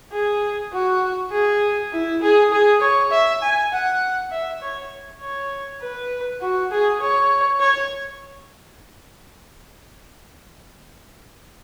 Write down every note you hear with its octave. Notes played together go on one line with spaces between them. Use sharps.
G#4
F#4
G#4
E4
G#4
G#4
C#5
E5
G#5
F#5
E5
C#5
C#5
B4
F#4
G#4
C#5
C#5